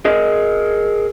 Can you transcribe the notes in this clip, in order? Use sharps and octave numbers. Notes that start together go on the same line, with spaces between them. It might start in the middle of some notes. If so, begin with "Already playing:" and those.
G#4 A#4 D#5